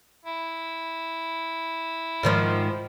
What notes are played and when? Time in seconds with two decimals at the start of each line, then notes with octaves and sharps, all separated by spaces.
0.25 E4
2.23 G#2 D#3 F3